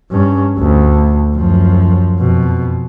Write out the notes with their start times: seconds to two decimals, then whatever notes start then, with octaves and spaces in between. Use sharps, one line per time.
0.11 G2 C#4
0.59 D2
1.35 F#2 F3
2.20 F2 B2